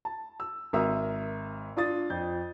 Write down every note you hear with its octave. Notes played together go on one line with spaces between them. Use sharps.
A5
E6
G#1 A#4 E5 D#6 E6
D4 F4 D#6 A6
F2 G6